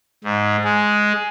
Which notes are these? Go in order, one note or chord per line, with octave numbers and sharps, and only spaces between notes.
G#2
G#3